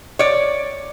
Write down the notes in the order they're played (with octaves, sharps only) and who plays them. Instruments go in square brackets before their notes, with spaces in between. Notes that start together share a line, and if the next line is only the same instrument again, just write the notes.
[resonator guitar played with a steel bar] C#5 D5